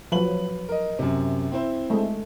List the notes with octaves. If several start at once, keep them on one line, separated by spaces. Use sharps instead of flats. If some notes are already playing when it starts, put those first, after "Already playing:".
F3 F#3 B4 F#7
A#4 D#5
F#2 C3
C4 E4 C5
G#3 A3